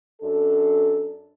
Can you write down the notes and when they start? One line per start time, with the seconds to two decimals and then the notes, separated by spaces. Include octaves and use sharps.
0.22 F#2 D4 A4